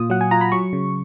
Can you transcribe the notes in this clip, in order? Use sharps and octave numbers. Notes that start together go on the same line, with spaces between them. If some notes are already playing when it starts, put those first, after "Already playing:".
Already playing: A#2 F4 D#6
F#3 F#5
G#5
F4 A#5
B5
F#3 C#6
C#3